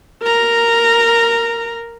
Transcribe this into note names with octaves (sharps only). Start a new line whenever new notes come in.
A#4 A#5